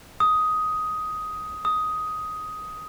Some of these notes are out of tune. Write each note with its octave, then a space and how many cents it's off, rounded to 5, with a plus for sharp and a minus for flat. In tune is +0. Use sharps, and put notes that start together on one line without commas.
D#6 +10
D#6 +10